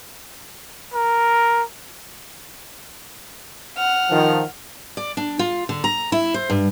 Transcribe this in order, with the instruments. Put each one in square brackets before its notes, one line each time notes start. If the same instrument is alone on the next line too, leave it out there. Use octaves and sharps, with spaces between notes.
[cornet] A#4
[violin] F#5 F6
[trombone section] D#3 F3
[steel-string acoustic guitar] D5
D4
F4
D3
A#5
E4
C5
G2